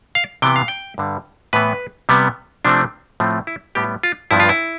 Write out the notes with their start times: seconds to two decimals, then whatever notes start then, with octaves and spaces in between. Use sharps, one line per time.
0.15 F5
0.42 C3 E3 B3 G5
0.56 F5
0.68 G5
0.98 G2 D3 G3
1.53 A2 E3 B3 B4
2.09 C3 G3 B3
2.65 C3 F3 A3 C4 D4
3.20 A2 F3 A3 C4
3.47 E4
3.75 A2 G3 B3 G4
4.03 F4
4.31 G2 F3 B3 E4
4.40 F4
4.49 E4